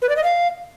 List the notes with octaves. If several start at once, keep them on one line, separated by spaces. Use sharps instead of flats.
B4
D5
D#5
F5